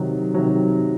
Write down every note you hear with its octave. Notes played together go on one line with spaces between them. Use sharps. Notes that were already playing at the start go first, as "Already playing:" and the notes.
Already playing: C3 D#3 F#3
C3 D#3 F#3